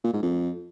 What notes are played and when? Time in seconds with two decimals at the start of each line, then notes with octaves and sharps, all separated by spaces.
0.04 A#2
0.13 G#2
0.23 F2